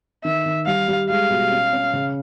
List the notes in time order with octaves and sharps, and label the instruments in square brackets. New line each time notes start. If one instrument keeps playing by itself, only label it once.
[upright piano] D#3 [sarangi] E5
[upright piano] D#3
[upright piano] G3 [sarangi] F5
[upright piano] G3
[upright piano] G#3 [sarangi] F5
[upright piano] B2
C#4
C#4
C#3